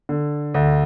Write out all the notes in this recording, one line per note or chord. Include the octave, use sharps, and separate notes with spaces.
D3
D2